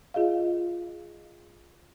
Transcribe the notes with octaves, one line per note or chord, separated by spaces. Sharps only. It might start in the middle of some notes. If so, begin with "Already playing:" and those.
F4 G#4 D#5 F5